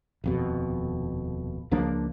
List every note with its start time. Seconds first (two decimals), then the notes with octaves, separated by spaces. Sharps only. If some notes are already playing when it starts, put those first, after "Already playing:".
0.24 D#1 F2 B2
1.71 C#2 F3 A#3 D4